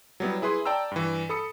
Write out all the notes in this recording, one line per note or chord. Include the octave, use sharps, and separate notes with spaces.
F#3 G3 B3 E4
E4 G#4 B4 C6
D5 G5 A5 A#5 E6
G2 E3
A4 B5 D#6 C#7